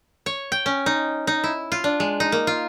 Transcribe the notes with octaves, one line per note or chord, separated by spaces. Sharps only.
C#5
G5
C#4
D#4
D#4
E4
F4
D4
G#3
D#4
A#3
F4